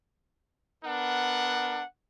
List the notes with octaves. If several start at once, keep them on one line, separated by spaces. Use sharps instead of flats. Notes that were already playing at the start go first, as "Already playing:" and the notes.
B3 D4 A#4 F#5